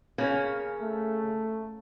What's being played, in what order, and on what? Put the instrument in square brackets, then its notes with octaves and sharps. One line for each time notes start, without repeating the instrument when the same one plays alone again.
[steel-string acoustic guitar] C#3 [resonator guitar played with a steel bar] A#3 C#4
[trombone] A3